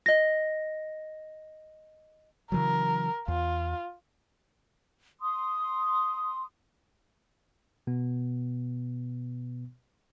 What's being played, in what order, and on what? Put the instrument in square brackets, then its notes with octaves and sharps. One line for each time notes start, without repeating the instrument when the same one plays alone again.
[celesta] D#5 A#6
[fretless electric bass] C#3 E3 F#3 [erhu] A#4
[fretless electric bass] E2 [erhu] F4
[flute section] C6 D#6
[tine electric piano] B2 B3